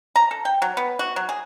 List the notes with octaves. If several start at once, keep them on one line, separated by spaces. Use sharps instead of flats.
A#5
A4
G5
F#3
B3
F#4
F#3
G#4